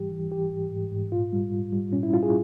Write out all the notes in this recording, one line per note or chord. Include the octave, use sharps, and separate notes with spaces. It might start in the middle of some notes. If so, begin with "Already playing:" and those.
Already playing: G#2 E3 G3 G4
E3
E3 G4
G#2
G#2
G#2
A#2 F4
G3
G3
G3
A#2 C#4
E4
G3 F4
G#4